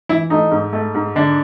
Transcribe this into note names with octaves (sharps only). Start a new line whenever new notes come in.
E3 E4
A3 D#4
G#2
A3
G#2
D3 D4